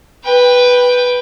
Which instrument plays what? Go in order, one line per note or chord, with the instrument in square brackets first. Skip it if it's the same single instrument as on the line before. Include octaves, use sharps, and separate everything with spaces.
[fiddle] B4 G5